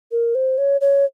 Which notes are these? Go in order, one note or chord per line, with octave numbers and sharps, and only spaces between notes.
A#4
C5
C#5
C#5